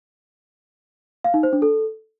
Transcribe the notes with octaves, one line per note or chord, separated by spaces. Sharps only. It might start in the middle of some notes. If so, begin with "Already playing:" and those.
F5
D#4
C5
D4
A4